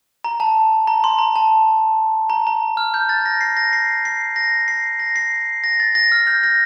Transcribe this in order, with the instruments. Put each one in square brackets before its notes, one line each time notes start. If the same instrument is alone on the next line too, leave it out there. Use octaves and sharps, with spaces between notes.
[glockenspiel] A#5
A5
A#5
C6
A#5
A5
A#5
A#5
F6
G6
A6
A#6
C7
A#6
C7
C7
A#6
C7
A#6
C7
A#6
A6
A#6
F6
G6
A#6